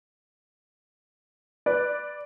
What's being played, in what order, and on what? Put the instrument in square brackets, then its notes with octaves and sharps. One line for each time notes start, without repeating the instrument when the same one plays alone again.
[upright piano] B4 [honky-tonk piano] D5